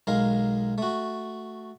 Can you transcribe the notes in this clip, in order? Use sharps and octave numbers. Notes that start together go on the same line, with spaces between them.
B1 G#3 A#4 F5
A3 F#4